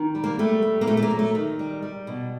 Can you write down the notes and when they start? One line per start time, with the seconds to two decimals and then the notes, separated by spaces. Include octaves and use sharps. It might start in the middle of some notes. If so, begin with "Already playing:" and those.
Already playing: D#3
0.15 G3
0.24 A#3
0.39 G3 A3
0.62 G3
0.81 A#3
0.87 A#2 A3
0.97 A3
1.02 A#3
1.11 F#3
1.19 A3
1.35 D#3
1.59 G3
1.82 G3
2.07 B2